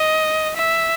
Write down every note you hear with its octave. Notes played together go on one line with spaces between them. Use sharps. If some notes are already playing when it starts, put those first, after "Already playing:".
Already playing: D#5
E5